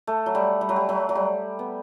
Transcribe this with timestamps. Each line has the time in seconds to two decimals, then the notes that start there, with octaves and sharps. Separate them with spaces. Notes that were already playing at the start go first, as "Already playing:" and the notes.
0.07 A3
0.26 F#3
0.35 G3
0.61 G3
0.69 F#3
0.76 G3
0.89 F#3
1.09 F#3
1.15 G3
1.59 B3